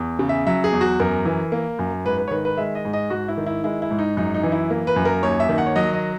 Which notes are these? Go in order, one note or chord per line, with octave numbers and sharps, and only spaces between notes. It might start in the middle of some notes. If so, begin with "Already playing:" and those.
Already playing: E2
C#3
E5
F#3 E5
G#4
E2
F#4
F#2 A#4
E3
A#3
F#2
G#2 B4
B4
C#5
D#3 B4
B4
G#3 E5
D#5
G#2
D#5
G#2 F#4
E4
D#3
E4
G#3 E4
E4
G#2
D#4
F#2 D#4
D#4
E3
E4
A#3
B4
F#2
A#4
D#2 C#5
E5
D#3
F#5
C#5
F#3 D#5
D#5